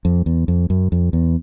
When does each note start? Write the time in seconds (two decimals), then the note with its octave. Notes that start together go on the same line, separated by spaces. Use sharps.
0.05 F2
0.26 E2
0.48 F2
0.70 F#2
0.92 F2
1.13 E2